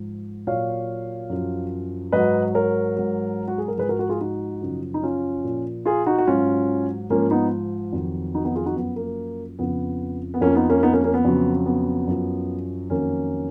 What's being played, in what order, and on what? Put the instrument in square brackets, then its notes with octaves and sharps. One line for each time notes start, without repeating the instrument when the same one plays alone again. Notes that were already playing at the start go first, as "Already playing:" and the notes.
Already playing: [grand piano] G#2 F3
A#2 F#3 C#5 F5
F#2 F3
G#2 F#3 B4 D#5
A#4 C#5
G#2 F#3
F#4
G#4
A#4
G#2 G#4 B4
F3
F#4 A#4
F#4 A#4
F4 G#4
D#4 F#4
F#2 C#3 F3
D#4
C#4 F4
A#2 F3
F4 G#4
D#4 F#4
F#4
G#2 F#3 C#4 F4
G#2 F3 A#3 C#4
B3 D#4
F2 D#3 F#3
D#4 F#4
B3 D#4
F4 G#4
D#4 F#4
F#2 F3 B3
A#3
F2 C#3 F3 B3
B3
F2 F3 A#3 C#4
B3 D#4
A#3 C#4
B3 D#4
A#3 C#4
A#3 C#4
B3
F2 C#3 F#3
B3
F#2 F3
F2 D#3 F#3 A#3 C#4